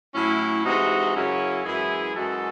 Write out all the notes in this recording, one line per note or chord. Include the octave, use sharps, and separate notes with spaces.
A2 F#3 C#4 E4
C3 E3 G#3 D#4 F#4
F#2 C#3 F#3 C#4 E4
F#2 E3 G#3 E4 G#4
F#2 E3 G#3 F#4 A4